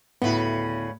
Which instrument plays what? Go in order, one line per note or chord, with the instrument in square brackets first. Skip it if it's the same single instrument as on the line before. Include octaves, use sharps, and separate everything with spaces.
[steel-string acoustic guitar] D2 A2 [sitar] C#3 B4 [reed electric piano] B3 E4